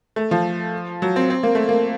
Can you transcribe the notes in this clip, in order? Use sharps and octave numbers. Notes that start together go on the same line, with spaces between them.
A3
F3
F#3
C4
C4
A#3
A3
A#3